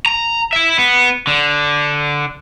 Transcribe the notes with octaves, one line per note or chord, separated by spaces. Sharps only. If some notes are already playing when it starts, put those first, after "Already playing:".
A#5
E4 E5
B3
D3